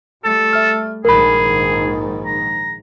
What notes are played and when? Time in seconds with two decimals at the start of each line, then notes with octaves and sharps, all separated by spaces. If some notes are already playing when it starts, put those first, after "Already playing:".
0.24 G3 A3 A4
0.53 E5 F6
1.05 A#1 G#2 D#3 G#4 A#4 B5
2.26 A#5